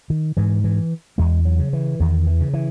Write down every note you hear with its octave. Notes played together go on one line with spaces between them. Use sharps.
D#3
G#2 E3
E3
E2 G#3
F#3
C#3
E3
E2 D#3
E3
C#3
E3